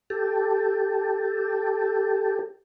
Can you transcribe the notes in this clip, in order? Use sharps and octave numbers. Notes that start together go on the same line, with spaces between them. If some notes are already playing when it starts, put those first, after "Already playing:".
G4 A4